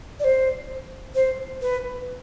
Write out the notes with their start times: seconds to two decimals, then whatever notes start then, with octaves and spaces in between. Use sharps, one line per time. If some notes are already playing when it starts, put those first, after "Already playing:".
0.20 D5
0.24 C5
1.15 C5
1.62 B4